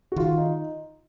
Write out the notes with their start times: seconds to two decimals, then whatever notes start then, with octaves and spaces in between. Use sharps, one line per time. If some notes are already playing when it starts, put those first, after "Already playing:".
0.12 F#4
0.16 D#3 F4
0.38 D#4